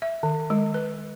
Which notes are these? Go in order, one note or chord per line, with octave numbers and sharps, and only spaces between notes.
E5
D#3
G#3
B4